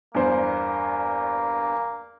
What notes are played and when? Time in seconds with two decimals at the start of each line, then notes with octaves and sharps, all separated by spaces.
0.15 E2 G2 A#3 C5